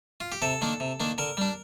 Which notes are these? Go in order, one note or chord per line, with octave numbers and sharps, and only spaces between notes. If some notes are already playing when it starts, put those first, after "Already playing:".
F4
G4
C3 A4
D#3 A#3 D4
C3
D#3 A#3 D4
D3 A#4
G3 D4